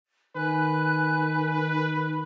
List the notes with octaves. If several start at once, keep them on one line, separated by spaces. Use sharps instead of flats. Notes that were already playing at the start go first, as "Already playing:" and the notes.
D#3 B4 G#5 F#6